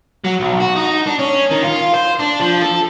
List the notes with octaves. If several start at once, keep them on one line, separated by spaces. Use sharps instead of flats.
F#3
B1
F#4
D#4
D4
C#4
D#3
F4
C5
D4
F3
A4